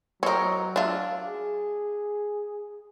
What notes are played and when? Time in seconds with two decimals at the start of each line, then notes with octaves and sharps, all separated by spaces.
0.23 F#3 C4 D#4 A#4 C#5
0.76 D4 F4 E5
1.27 G#4